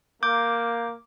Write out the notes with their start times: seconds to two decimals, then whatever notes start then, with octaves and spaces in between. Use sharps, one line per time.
0.23 A#3 D6 G6